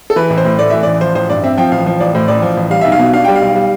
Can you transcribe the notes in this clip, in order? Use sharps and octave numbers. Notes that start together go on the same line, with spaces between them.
A4
E3 B4
A1
C5
A2
A3 D5
E3 E5
A1 D5
F3 C5
A1 C5
G2 D5
C4 E5
F3 G5
A1 F5
F3
A1 D5
A2 C5
A1 D5
F3
A1
G3 F5
B1 E5
F5
B2
D4 F5
G3 G5
F5
B1
G3